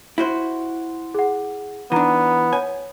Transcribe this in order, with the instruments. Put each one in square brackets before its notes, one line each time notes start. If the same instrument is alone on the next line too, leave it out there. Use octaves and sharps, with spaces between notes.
[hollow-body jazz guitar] E4 F#4 C5
[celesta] G#4 F#5
[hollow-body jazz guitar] E3 D4 [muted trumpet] B3 [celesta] D#4 A#5 D#7
[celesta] C#5 [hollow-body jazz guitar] G#5